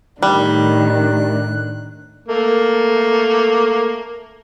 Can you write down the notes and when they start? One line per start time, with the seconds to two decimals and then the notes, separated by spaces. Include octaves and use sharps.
0.22 A2 D#3 G3 D4 F#6
2.28 A3 A#3